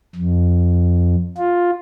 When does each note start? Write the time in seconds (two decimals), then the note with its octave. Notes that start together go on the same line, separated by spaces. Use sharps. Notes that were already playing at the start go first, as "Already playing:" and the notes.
0.15 F2
1.38 F4